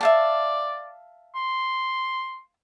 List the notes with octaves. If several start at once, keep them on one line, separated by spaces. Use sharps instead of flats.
D5 E5 F5 A5
C6